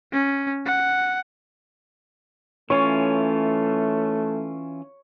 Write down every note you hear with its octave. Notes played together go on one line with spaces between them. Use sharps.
C#4
F#5
E3 A3 C#4 F4 C#5